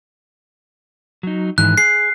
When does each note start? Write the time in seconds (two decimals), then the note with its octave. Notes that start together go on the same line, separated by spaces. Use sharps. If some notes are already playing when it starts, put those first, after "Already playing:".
1.23 F#3 D#4
1.58 G#2 D#3 E3 F#6
1.78 G#4 C7